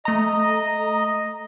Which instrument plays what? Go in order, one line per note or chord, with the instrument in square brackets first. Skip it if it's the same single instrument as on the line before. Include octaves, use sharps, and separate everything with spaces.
[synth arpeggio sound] A3 A#5 [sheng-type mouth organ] D#5